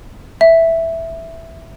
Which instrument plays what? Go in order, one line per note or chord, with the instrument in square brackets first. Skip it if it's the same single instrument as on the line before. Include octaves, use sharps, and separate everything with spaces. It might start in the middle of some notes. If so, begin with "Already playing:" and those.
[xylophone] E5